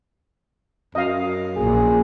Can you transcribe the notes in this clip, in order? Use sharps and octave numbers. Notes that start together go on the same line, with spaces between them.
F#2 D#5 F5
A#1 A#2 G#4